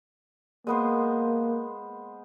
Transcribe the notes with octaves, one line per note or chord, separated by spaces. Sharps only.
G#3 A#3 B3 C5